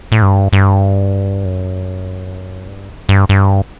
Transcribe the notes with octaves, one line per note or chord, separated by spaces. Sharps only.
A2
G2
G2
F#2
G2
G2
G2